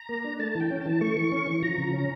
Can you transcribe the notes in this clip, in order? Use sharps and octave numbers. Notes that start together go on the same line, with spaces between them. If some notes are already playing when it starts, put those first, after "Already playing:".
Already playing: A#5
A#3
D4
A3 A5
E3 A5
G5
C#4
A5
E3
A3 C#6
E3
C#4
E3
F3 A#5
C#3
C#4